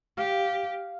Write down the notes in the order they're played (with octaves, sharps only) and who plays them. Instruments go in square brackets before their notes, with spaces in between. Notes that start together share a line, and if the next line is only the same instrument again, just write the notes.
[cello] G4 [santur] F5